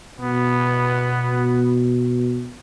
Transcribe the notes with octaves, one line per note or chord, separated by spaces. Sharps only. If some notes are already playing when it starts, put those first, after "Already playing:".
B2 B3